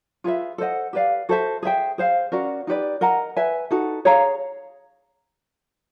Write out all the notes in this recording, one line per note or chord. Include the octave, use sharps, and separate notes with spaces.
F4 G#4 B4 E5
A4 C5 D#5 F#5
G4 B4 D5 F5
F#4 A4 C5 E5
G#4 C5 E5 G5
G#4 C5 F5
C#4 F#4 A#4 D5
D#4 G4 B4 D5
A#4 D#5 F#5 A#5
B4 E5 G#5
D#4 F#4 A4
G#4 C#5 F5 A#5